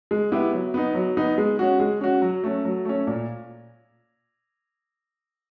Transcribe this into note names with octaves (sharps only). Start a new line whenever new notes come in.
G#3
B3 E4 G4
F#3
B3 D#4
F#3
B3 D#4
G#3
C#4 F#4
G#3
C#4 F#4
F#3
A3 C#4
F#3
A3 C#4
A#2